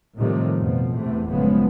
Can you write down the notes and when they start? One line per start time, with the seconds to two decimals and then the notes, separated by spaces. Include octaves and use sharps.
0.17 A2 C3 D#3 F3 G3 A3
0.57 F2 B2 F3
0.95 E2 C3 E3 A3
1.29 F#1 A2 C#3 F3 G#3 B3